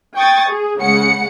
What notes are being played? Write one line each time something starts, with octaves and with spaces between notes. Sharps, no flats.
G5 C#6 D#6 G#6 A6
G#4
C#3 G#3 F#5 C#7